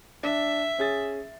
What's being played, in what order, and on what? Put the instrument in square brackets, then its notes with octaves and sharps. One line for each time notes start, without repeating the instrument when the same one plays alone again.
[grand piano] D4 [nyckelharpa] E5
[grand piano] C#4 G#4 A6